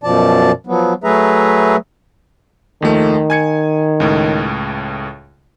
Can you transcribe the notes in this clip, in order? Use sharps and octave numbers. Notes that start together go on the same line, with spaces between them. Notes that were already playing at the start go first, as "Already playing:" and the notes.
F#2 B2 F3 D5 A5
F3 F#3 B3
F#3 A3 G#4 B4 E5 A#5
D#2 D#3 F3 A3
G#5 G#6 C#7
C#2 A2